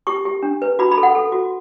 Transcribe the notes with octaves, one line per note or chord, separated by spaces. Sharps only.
G4 C#6
G4
D4
B4
F#4 B5
B5
A4
F#5
A4
F#4